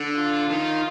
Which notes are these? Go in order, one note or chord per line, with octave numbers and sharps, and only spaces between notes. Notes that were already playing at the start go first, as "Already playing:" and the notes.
Already playing: D3
F4
D#3